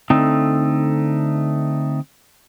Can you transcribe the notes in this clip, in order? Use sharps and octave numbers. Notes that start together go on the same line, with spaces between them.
D3 A3 C4 D#4